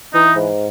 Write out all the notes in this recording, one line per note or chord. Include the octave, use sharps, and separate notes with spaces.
E3 D#4
G#2